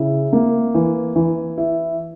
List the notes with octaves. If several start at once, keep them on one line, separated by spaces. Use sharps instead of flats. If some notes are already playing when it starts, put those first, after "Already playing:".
Already playing: C#3 E4
A#3
E3
E3
E4